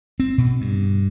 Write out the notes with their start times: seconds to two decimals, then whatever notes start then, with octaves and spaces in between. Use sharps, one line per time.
0.20 C4
0.38 B2
0.61 G2